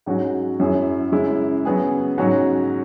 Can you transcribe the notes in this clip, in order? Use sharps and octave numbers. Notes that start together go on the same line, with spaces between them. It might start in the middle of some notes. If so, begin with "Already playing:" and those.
G#2 F#3 C#4 F#4
F#2 F#3 E4 G#4
F#2 C#3 G#3 E4
C#3 F#3 B3 G#4
G#2 F#3 C#4 F#4